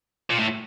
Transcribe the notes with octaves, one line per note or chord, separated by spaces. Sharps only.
A#2
A2